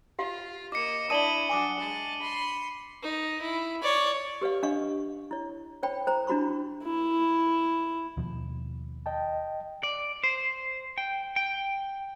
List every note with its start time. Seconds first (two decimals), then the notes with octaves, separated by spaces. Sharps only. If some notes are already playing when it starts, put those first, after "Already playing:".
0.19 F4 G4 F5
0.72 A#3 D#5 D6 C#7
1.10 D4 E4 D5 A5 D#6 D#7 F#7 G7
1.49 D4 F#4 G#5 D6 D#6
1.79 G#3 A5
2.21 B5 C6
3.03 D#4
3.42 E4
3.82 C#5 D5
4.41 G4 B4 C#5 F5
4.63 D4 D#5 F5 C#6
5.31 E4 C#5
5.83 C5 C#5 G5 B5
6.07 E4 C5 A#5
6.27 D4 E4 F#4 B5 C#6
6.84 E4
8.17 D#2 B2 F3
9.06 D#5 G5 A5
9.83 D5
10.24 C5
10.98 G5
11.36 G5